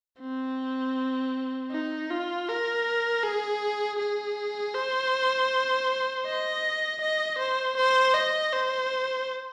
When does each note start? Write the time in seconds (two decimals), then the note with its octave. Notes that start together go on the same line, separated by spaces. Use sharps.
0.21 C4
1.71 D#4
2.10 F4
2.48 A#4
3.23 G#4
3.99 G#4
4.74 C5
6.26 D#5
7.01 D#5
7.39 C5
7.77 C5
8.15 D#5
8.53 C5